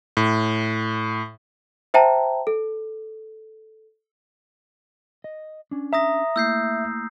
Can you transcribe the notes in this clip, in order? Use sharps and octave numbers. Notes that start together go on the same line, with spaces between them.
A2
C5 E5 G5 A5 A#5
A4
D#5
C#4 D4
E5 A#5 D#6 A#6
A3 A#3 E4 E6 G6 C7